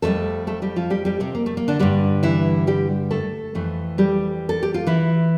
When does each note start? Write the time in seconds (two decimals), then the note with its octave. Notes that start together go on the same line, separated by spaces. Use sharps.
0.02 F2 E3 G3 A3 A4
0.47 A3 A4
0.62 G3 G4
0.76 F3 F4
0.90 G3 G4
1.05 G3 G4
1.20 C3 C4
1.35 A#3
1.46 A3
1.57 A#3
1.68 D3 D4
1.79 G2 D3 G3
2.23 E3 E4
2.67 G3 G4
3.11 A3 A4
3.55 F2 E3 A3
3.98 G3 G4
4.49 A4
4.63 G4
4.74 F4
4.87 E3 E4